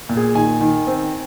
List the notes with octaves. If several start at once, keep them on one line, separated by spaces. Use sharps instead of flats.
A#2
G#4
D#3 G#5
D#3
C4